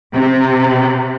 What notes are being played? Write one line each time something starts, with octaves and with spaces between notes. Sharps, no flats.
C3